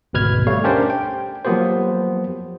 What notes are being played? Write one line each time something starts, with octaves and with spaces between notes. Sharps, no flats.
G#1 D2 B2 B4 F6 G#6
G3 A3 C#5 F5
C#4 D4 G4 A#4 C5 D5
G5
F3 F#3 A#3 B3 G4 C5